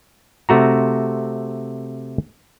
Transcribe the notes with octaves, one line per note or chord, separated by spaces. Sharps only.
C3 A3 F#4 A#5